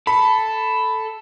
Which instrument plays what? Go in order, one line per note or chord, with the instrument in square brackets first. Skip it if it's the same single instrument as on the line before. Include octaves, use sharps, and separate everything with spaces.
[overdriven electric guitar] A4 [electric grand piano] B5